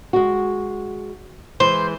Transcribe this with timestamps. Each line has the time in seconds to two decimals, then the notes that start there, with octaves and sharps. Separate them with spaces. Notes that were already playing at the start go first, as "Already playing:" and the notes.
0.13 G#3 F#4
1.60 E3 G#3 C5